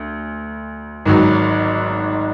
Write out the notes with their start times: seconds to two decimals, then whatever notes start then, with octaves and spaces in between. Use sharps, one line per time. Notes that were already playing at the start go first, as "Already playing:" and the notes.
Already playing: D2
1.06 G#1 G#2 D#3 F#3